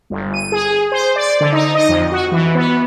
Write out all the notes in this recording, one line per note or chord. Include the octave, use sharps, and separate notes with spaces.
G1
D#7
G#4
C5
D5
D3
D#4
D#5
F2
F#4
E3
B3